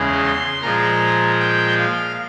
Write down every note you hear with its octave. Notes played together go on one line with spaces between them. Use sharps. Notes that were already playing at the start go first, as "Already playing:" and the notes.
Already playing: E2 C#3 E3 G#3
C6
A#2 F3 G#3 A#5
G5
F5